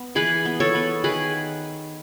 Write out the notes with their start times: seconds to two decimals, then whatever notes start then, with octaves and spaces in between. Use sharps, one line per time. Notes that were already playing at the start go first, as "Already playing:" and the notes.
Already playing: B3
0.15 E3 G#4 B4
0.45 B3
0.60 A4 C#5
0.75 B3
1.04 D#3 G#4 B4